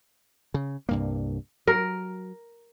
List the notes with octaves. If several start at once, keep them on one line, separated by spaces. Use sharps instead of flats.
C#3
C2 G2 A#3
F#3 A#4